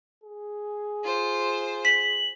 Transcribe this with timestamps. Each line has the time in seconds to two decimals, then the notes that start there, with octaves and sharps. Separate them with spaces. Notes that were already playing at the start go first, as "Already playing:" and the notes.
0.24 G#4
1.04 F4 C5
1.85 B6 F#7